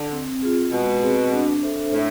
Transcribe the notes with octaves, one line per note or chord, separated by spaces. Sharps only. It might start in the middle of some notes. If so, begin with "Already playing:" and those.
Already playing: D3
C4
F4 G#4
B2 G#3
C4 G#4
D4
A4 C5 E5
A2 D4